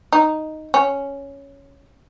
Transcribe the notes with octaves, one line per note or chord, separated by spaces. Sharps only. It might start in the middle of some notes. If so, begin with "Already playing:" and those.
D#4
C#4